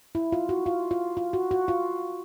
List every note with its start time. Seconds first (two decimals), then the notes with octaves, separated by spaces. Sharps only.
0.15 E4
0.32 F4
0.49 F#4
0.66 F4
0.91 F4
1.17 F4
1.33 F#4
1.51 F#4
1.68 F4